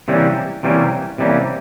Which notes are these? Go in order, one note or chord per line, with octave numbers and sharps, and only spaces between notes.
C3 E3 G3 A#3 C#4
C3 E3 G3 A#3 C#4
C3 E3 G3 A#3 C#4